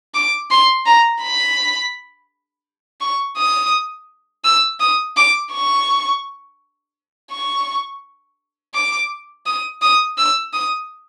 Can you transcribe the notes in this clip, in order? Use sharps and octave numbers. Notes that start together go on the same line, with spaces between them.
D6
C6
A#5
B5
C#6
D#6
E6
D#6
D6
C#6
C#6
D6
D#6
D#6
E6
D#6